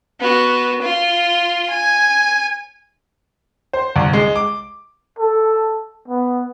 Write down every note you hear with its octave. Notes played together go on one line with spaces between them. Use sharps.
B3 F#4
F4 C6
G#5
C5
C2
G#3
D6
A4
B3